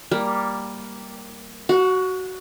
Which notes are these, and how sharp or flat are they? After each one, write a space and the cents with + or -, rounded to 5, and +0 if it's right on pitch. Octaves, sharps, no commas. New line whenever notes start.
G3 +0 A#3 +0
F#4 +15 F#5 -25